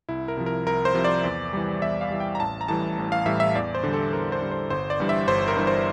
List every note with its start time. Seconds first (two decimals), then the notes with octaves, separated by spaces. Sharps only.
0.09 C2 E4
0.28 A#4
0.37 C3 F3
0.46 A#4
0.66 C2 A#4
0.85 C5
0.95 C3 F3
1.04 D5
1.24 E2
1.53 E3 G3
1.82 E2 E5
2.01 F5
2.11 E3 G3
2.20 G5
2.35 A#5
2.40 A1 A5
2.61 A#5
2.68 A2 E3 G3 A5
2.98 A1
3.12 F5
3.26 A2 E3 G3 E5
3.40 E5
3.55 E2 D5
3.75 C5
3.83 D3 G3
3.93 A4
4.13 E2 A#4
4.32 C5
4.41 D3 G3
4.51 C5
4.70 G1 C5
4.90 D5
5.00 G2 E3 G3
5.09 E5
5.28 G1 C5
5.48 A#4
5.57 G2 E3 G3
5.67 C5